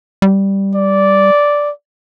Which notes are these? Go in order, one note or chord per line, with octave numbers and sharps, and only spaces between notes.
G3
D5